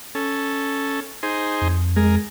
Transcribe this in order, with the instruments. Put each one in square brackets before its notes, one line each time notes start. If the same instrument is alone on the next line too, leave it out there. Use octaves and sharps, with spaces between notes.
[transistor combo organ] C#4 A4
D#4 G#4 C5
[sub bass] F2
[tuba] G#3 [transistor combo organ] G#4 A#4